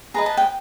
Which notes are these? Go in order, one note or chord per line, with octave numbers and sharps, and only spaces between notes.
G#4 B4 D#5 A#5
A5
G5